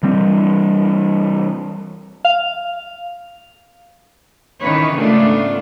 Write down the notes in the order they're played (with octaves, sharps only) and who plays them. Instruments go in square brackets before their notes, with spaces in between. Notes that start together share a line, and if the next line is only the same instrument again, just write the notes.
[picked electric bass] E3 G3 C4
[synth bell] F5
[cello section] D#3 E3 C#4 B4 C#5
G#2 C#3 A3 B3 D4 F4